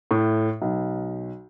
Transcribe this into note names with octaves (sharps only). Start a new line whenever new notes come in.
A2
B1